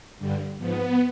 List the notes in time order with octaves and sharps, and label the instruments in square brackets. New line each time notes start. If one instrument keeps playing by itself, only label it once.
[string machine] G2 D3 G3
G#2 F3 B3